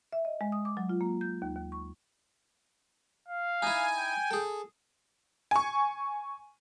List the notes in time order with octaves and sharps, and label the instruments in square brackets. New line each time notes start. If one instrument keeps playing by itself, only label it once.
[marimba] E5
D#5
G#3
D#6
D6
F#3
F4
A#3
G6
D#2
D#2
C#6
[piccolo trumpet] F5
[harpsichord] D#4 E4 [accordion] G#5
[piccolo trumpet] G5
[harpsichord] G#4 A4
[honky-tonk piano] G#5 C#6